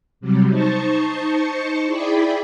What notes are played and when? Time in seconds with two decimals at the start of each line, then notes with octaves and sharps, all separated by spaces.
0.20 C3 F#3 G3
0.50 D#4 C5 A5 C#6 C#7
1.86 E4 G#4 D5 G5 B5